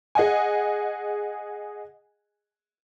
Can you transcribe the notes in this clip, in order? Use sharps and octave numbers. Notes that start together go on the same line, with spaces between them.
G#4 D#5 F#5 G#5